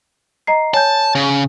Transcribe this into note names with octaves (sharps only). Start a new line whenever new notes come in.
D#5 A#5 C7
C#5 G#5 A5 G6
C#3